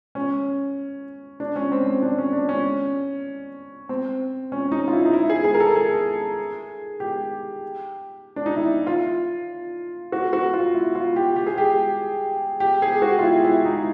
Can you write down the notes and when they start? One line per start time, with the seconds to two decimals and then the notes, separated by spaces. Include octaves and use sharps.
0.15 C#4
1.40 D4
1.56 C#4
1.72 C4
1.87 C4
2.02 D4
2.18 C#4
2.33 D4
2.49 C#4
3.89 C4
4.52 C#4
4.72 D#4
4.88 F4
4.93 E4
5.06 D#4
5.14 E4
5.30 G#4
5.44 G#4
5.54 A#4
5.60 A4
5.75 G#4
7.00 G4
8.36 D4
8.46 D#4
8.56 E4
8.87 F4
10.12 F#4
10.33 F#4
10.53 F4
10.74 E4
10.95 F4
11.16 G4
11.36 G4
11.46 G#4
11.58 G4
12.60 G4
12.82 G#4
13.02 F#4
13.19 F4
13.23 E4
13.44 E4
13.65 D#4